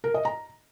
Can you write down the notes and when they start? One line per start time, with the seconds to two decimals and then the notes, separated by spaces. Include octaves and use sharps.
0.04 A#4
0.14 D#5
0.25 A#5